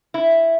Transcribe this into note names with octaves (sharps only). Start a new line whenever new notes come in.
E4